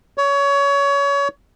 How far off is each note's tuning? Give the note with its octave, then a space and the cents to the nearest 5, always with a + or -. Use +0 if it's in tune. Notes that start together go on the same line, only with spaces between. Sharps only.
C#5 +25